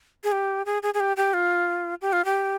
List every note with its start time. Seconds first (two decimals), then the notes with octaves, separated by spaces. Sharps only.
0.24 G#4
0.32 G4
0.66 G#4
0.82 G#4
0.94 G#4
1.00 G4
1.17 G4
1.34 F4
2.01 G4
2.13 F4
2.25 G4